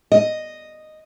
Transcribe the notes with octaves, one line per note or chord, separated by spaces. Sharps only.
D#5